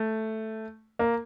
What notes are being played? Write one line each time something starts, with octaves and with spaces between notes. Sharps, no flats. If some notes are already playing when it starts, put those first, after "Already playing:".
Already playing: A3
A#3